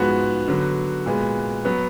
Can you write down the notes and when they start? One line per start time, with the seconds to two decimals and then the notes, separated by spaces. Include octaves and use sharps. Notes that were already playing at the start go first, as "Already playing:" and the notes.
Already playing: G#2 F3 G#3 B3 F#4
0.48 D3 F#3 B3
1.06 A#2 G#3 B3
1.65 F#3 B3